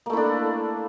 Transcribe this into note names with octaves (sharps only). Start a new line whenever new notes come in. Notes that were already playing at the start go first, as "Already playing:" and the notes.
A3 A#3 D4 E4